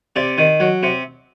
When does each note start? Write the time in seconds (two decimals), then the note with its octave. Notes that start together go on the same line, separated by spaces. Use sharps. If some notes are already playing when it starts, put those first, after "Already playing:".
0.16 C3 D5
0.38 D#3
0.60 F#3
0.83 C3